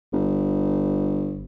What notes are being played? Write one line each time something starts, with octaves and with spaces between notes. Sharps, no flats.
G1